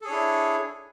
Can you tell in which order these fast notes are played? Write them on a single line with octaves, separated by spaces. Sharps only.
A4 G#4 C#5 D4 E4